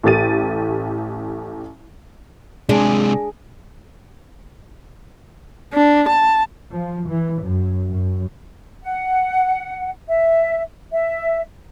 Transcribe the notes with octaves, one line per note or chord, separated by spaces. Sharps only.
A1 A3 G4 A6 D#7
C3 G#3 D4 G#4
D4
A5
F3
E3
F#2
F#2
F#5
E5
E5